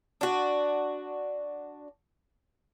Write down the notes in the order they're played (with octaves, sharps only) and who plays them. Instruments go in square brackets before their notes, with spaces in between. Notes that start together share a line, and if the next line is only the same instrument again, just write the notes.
[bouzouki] D4 F#4